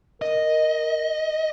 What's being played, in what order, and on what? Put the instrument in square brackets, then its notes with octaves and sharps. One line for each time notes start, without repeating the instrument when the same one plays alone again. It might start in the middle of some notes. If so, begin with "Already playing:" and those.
[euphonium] A#4 [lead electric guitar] D#5